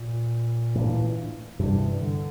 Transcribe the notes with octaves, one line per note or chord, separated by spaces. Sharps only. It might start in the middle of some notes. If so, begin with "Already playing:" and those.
Already playing: A#2
A2 E3 A#3 D4
G2 C3 E3 G3 D4
D3